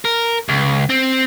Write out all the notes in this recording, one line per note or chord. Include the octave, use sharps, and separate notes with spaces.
A#4
C#2
C4